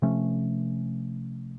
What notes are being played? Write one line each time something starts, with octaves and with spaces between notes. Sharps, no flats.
C3 F3 A3 C#4